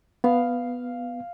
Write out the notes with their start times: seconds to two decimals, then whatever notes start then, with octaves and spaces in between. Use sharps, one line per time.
0.24 B3 F5